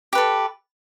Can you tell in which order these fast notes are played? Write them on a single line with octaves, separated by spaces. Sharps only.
G4 B4 A4